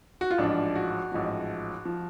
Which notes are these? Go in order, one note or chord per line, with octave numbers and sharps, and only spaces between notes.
F#4
F4
A1 G#2 F3 D4
F#4
A1 G#2 F3
F3